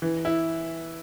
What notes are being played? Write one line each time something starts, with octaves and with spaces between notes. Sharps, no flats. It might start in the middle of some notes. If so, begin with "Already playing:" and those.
E3
E4